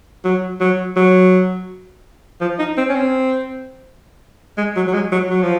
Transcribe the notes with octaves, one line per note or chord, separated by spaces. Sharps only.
F#3
F#3
F#3
F3
D#4
C4
C#4
C4
G#3
F#3
F#3
G#3
F#3
F#3
F3